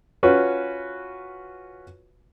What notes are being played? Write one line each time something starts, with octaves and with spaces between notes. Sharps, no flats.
C#4 F4 F#4 B4